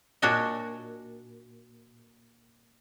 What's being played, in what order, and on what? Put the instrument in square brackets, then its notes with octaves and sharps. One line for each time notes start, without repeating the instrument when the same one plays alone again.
[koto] A#2 D4 F#4 C#5 D#5